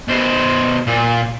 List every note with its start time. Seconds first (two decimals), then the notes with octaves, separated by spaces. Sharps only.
0.08 B2 C5
0.87 A#2